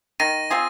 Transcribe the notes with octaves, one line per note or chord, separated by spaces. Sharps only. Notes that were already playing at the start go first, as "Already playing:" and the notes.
D#3 A#6 D#7
C4 F4 G#4